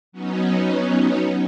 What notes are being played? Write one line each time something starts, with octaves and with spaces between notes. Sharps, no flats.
F#3 B3 C#4 D#4